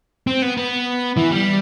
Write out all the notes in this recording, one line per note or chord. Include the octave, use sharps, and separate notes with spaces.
C4
B3
B3
E3
G3